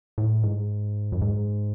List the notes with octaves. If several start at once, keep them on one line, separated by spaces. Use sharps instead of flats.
A2
G#2
F#2
G#2